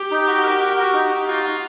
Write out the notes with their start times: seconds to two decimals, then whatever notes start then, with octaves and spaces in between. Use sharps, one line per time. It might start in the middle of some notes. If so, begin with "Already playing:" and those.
Already playing: G4
0.11 D#4
0.27 F#4
0.43 A#4
0.60 F#4
0.76 F#4
0.93 D#4
1.10 D#4
1.27 F4 F#4
1.43 F#4